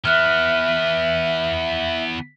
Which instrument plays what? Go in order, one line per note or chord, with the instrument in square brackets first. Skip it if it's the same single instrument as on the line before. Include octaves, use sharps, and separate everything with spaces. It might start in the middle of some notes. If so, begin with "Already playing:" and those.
[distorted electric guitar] E3 B3 [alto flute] E5 [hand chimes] F6 F#6